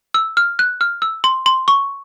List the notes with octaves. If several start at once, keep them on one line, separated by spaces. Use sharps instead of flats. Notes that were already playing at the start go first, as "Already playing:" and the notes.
E6
F6
F#6
F6
E6
C6
C6
C#6